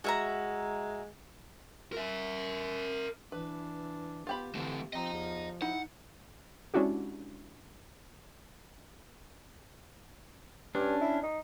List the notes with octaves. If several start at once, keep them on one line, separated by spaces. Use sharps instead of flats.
G#3 F#4 E5 A#5
A#4 E5
E3 D4 B4
B3 F4 G4 B5
D3 E3 A3 C4
F3 C4 D#5 A#5
E2
D#4 E4 F#5
G#3 C#4 D4 E4 F#4 G4
G2 C#4 D4
E4
D#4